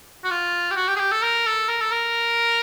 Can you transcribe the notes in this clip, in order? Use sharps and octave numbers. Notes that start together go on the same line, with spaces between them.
F#4
F4
G4
F#4
G4
G#4
G4
A4
A#4
A4
A#4
A4
A#4